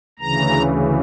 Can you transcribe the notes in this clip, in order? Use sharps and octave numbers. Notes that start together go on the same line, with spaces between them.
D2 C#3 E3 A#5